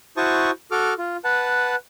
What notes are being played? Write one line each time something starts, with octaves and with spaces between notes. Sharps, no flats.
E4 F#4 C5 A5 C#6 D#6
F#4 A4 D6 F6
F4
B4 F#5 A5